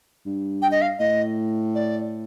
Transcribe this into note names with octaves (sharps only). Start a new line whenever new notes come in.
G2
G5
D#5
F5
A2 D#5
D5